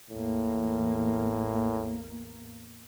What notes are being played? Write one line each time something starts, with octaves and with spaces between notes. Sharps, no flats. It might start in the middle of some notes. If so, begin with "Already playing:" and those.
A1 E2 A2 A#3